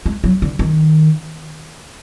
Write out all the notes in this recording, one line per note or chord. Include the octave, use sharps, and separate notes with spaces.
G#3
F#3
D3
D#3